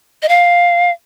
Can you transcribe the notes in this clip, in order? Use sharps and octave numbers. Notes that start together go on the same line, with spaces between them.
D#5
F5